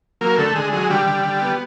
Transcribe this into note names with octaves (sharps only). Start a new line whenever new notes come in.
F#3 A#3 A#4
D3 A3 A4
D3 G#3 G#4
F#3 G#3 G#4
D3 G3 G4
D3
D3
B3